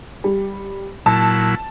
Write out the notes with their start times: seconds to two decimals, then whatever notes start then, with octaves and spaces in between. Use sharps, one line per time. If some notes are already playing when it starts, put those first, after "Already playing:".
0.24 G3
1.06 A#2 F#3 E4 A5